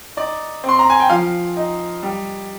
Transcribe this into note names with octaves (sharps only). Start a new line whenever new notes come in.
D#4 D5
C4 C6
A#5
G#5
G5
F3 F5
D#4
G3